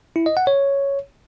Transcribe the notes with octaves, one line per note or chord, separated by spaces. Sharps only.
E4
D#5
F#5
C#5